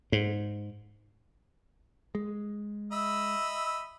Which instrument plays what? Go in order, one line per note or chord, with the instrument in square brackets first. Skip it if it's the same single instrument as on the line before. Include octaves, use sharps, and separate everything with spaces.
[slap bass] G#2
[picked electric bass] G#3
[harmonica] D#5 B5 E6 [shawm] E5